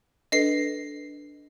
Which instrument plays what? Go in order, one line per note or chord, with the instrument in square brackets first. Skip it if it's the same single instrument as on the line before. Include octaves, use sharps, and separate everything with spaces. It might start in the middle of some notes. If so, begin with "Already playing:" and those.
[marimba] D4 A4 B4 [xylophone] D#5 C7